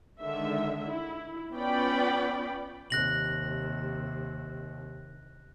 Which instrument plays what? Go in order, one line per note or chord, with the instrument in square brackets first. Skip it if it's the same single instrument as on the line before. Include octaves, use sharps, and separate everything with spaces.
[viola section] D3 D#3 G#3 E5
E4
B3 C#4 F4 D5 G5 B5
[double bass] D#2 C3 [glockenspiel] F#6 A#6 F#7